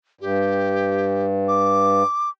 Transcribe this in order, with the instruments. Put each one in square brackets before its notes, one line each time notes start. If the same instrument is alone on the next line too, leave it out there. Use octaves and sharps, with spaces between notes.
[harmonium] G2 [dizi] G4
[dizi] D6